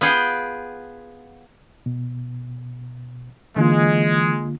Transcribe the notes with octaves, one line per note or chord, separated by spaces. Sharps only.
B3 F4 G#4 F#5 G5
B2
D3 E3 G#3 A#3 F4